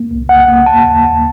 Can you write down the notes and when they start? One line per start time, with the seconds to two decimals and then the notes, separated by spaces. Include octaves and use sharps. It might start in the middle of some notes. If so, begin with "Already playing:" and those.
Already playing: A#3
0.11 C2
0.29 C2 F#5
0.48 A#3
0.66 D#2 A5
0.86 D#2
1.05 D#2